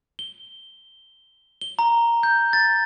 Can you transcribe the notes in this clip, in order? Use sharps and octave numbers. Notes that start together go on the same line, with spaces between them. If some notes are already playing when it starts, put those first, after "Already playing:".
G7
G7
A#5
G6
A6